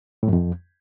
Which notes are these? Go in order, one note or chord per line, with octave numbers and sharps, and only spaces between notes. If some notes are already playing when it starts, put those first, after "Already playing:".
A2
F#2
F2